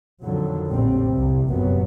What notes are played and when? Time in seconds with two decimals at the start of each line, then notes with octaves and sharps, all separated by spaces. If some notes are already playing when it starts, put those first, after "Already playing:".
0.23 F2 D3 D#3 F3 F#3
0.68 A#1 F2 A2 G3 C4
1.10 C2 C3
1.50 F1 A#1 F#2 C3 F#3 B3